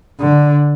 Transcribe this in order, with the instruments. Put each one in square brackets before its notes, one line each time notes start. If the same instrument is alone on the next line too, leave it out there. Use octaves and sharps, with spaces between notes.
[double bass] D3